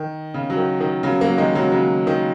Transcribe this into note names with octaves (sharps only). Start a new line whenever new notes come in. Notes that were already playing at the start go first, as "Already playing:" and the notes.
Already playing: D#3
C#3
F#3
D#3
D#3
C#3 F#3
F#3 A#3
D#3 G#3
C#3 F#3
C#3 F#3
D#3